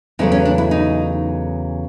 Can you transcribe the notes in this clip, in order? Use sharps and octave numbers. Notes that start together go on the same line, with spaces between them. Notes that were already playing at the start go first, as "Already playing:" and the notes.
E2 C#3 F#3 A3 C4 D#4
C#4
D4
E4
D#4